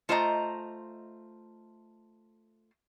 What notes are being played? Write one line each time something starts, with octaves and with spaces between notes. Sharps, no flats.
A3 F4 C5 D#5 E5 A#5